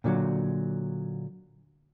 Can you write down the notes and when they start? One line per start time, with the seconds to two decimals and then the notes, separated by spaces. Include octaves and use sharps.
0.04 A#2 D3 F3 F#3